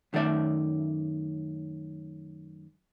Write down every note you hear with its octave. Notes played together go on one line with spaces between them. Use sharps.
F#2 D#3 A3 E4 D5 E5